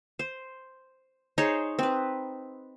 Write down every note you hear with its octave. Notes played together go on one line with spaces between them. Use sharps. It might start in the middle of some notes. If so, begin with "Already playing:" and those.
C5
D#4 G#4 C5 C#5
C4 B4